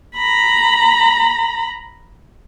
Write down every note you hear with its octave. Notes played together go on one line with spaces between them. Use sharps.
A#5 B5